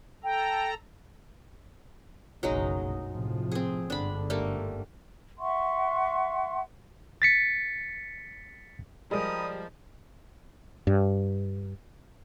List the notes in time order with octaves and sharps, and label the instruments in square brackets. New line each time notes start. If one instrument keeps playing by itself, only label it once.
[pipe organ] A4 A#5 [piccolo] G5
[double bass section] F#1 B1 G2 [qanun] F#3 G#3 D#4
[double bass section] A2 C3 F3
[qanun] C4 G#4
[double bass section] G1 G#2 D3 [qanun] D4 B5
[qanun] G3 A3 A#3
[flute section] E5 F#5 C6 C#6
[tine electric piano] A6 B6 C#7
[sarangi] F3 [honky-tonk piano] G3 [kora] G#3 A#4 G5 [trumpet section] A#5 B5 D#6
[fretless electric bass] G2